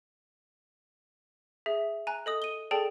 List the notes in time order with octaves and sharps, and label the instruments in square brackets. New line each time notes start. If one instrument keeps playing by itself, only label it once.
[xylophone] G#4 E5
G#5 A#5 F#6
A4 D#5 D#6
D#7 G7
G#4 A4 D5 G5 A5